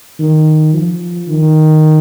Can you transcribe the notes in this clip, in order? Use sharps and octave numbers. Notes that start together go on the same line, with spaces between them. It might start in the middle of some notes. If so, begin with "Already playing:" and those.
D#3
F3
D#3